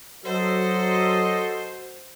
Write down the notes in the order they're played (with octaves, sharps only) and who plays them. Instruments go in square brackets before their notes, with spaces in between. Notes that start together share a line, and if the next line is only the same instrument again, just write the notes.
[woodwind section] F#3 [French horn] F#4 [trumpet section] A4 D#5 [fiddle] C5